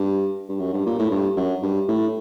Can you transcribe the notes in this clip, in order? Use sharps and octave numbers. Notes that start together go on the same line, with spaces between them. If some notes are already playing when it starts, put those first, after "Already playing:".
Already playing: G2
G2
F#2
G2
A#2
A2
G2
F#2
G2
A2